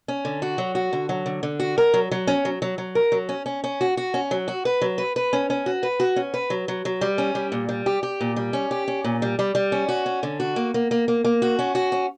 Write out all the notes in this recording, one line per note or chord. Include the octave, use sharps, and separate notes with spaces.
C#4
D3
F#4
F#3
F#4
D3
F#3
D3
D3
F#4
A#4
F#3
F#3
C#4
F#3
F#3
F#3
A#4
F#3
C#4
C#4
C#4
F#4
F#4
C#4
F#3
F#4
B4
F#3
B4
B4
C#4
C#4
F#4
B4
F#4
C#4
B4
F#3
F#3
F#3
G3
C#4
G3
A#2
G3
G4
G4
A#2
G3
C#4
G4
C#4
A#2
G3
G3
G3
C#4
F#4
C#4
D3
F#4
A#3
A#3
A#3
A#3
A#3
F#4
C#4
F#4
C#4